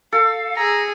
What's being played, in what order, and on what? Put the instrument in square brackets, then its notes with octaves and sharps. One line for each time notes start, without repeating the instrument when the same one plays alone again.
[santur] A4 [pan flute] F5
[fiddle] G#4 [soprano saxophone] A#5 [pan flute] E6